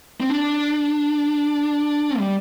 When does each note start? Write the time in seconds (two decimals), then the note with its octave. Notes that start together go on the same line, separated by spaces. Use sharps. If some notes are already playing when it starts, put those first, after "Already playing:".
0.20 C4
0.30 D4
2.18 G3